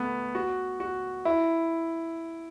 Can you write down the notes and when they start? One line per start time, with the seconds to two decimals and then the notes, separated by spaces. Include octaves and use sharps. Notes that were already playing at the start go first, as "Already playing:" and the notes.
Already playing: A3 B3
0.35 F#4
0.80 F#4
1.25 E4